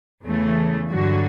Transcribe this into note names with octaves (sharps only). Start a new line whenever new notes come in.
E2 C#3 E3 A3
G2 D3 F#3 F#4